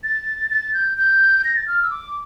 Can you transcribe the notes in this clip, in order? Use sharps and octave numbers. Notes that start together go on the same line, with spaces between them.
A6
A6
G6
G6
A#6
A6
F6
E6
D6